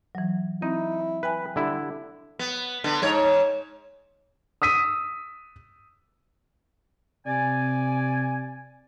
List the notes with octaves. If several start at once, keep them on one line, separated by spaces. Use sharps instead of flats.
E3 F#3
C4 D#4 E4
B4 E5 G5 G#5
D3 G3 E4
B3
D3 B3
G#2 C#5
D#6 E6 B6 D#7
C3 D5 G#5